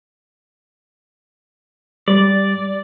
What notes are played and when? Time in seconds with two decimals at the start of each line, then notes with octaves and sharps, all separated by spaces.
2.08 G3 D5